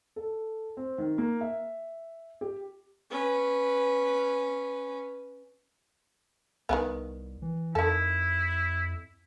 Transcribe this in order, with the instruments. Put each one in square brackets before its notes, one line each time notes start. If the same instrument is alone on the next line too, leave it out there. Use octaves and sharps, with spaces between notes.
[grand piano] A4
C4
D#3
A#3
E5
G4
[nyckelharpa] C#4 B4
[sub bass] C2 [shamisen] D#3 G#3 B3
[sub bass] E3
[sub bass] F2 [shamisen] D#3 A4 [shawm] E4